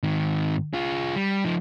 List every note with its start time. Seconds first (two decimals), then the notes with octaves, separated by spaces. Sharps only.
0.03 G#2 D#3
0.74 F4 G#4
1.16 G3
1.45 F3 D#4